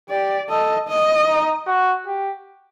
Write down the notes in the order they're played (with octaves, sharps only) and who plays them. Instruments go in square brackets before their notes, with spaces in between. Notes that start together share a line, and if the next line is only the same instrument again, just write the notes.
[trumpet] G4 [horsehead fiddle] D5
[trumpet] A4 [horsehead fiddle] D#5
[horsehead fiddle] D#5
[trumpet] D#4
F#4
G4